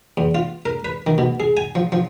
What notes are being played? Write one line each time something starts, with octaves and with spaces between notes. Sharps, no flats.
E2
F4
A#4
B4
D#3
B2
G#4
G#5
F3
F3